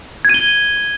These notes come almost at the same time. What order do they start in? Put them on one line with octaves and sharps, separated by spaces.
G#6 D#7 G7